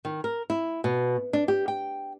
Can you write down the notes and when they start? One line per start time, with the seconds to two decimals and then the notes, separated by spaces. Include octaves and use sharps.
0.05 D#3
0.24 A#4
0.50 E4
0.84 B2
1.33 D4
1.48 G4
1.68 G5